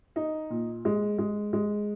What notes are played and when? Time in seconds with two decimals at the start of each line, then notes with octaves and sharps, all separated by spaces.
0.16 D#4
0.50 A#2
0.85 G#3
1.18 G#3
1.53 G#3